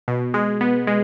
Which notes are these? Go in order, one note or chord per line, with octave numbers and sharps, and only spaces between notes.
B2
G#3
B3
G#3